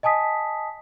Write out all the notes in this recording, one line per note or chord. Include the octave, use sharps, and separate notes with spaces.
D#5 G#5 A5 D#6 B6